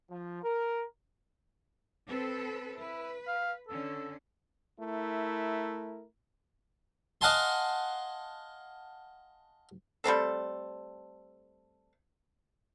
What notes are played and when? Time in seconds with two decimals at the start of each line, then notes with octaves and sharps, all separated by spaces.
0.11 F3
0.43 A#4
2.08 C4 A4 B4
2.77 E4 B4
3.27 F5
3.68 D3 C#4 A4
4.79 A3 E4 A#4
7.21 D#5 F5 F#5 G#5 A5 C6
10.04 G3 A3 C4 A4